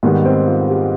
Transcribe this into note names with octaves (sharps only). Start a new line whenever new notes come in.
G#2 D#3 G3 B3
C4
F4
G4